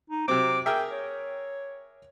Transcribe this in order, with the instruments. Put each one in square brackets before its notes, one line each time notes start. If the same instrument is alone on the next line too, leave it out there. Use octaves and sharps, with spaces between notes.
[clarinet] D#4
[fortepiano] C3 F#3 C4 [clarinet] D6
[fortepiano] G#4 A#4 E5 [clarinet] G5
[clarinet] C#5